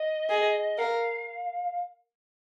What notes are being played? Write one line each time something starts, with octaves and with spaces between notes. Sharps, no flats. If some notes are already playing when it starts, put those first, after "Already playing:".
Already playing: D#5
G#4
A#4 F5